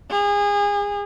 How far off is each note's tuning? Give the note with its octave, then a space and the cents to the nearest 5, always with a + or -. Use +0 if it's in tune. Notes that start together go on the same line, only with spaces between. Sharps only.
G#4 -30